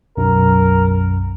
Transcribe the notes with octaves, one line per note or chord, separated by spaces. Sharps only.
B1 F#2 A#4